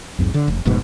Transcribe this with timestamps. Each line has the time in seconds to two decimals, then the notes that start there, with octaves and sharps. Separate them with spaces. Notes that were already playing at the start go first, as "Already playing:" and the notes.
0.18 B1 F2 G#2
0.34 D3
0.48 F1
0.65 F1 G#2 B2